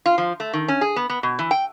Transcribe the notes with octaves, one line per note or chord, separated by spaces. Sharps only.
F4
F3
A3
D#3
C#4
G#4
B3
B3
B2
E3
G5